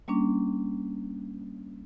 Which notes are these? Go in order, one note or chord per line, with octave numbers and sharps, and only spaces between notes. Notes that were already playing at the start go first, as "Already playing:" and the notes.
G3 A#3 C#4 D4